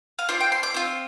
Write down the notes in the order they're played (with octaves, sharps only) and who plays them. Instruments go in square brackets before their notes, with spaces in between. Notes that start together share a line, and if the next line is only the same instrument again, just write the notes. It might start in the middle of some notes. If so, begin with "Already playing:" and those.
[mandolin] F5
C4 F4 D5
G5
C6
D6
C4 F4